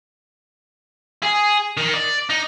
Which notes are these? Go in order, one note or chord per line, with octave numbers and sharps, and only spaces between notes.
G#4
D#3
D5
D#4